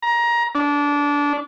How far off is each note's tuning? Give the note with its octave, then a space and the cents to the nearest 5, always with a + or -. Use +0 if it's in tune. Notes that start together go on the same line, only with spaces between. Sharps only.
A#5 +20
D4 -20